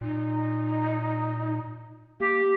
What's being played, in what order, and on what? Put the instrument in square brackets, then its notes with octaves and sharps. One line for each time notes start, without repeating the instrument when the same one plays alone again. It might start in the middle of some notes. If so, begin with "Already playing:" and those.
[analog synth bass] A#2 [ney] D#4
[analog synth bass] A#3 [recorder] G4